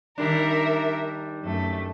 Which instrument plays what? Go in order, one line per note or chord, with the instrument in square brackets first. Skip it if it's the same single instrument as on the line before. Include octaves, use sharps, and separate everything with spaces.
[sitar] D#3 G3 D4 [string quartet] A#4 E5
[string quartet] F#2 A3